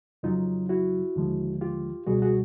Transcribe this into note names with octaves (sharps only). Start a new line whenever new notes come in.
F2 C#3 F#3 D#4 F4
E4 F#4
D#2 D3 F3 G#3
F4 G4
C#2 B2 G3 F#4 G#4
F#4 G#4